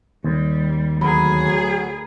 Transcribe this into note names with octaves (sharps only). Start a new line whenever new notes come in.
D#2 G3
D2 F#3 G#4 A#4 B5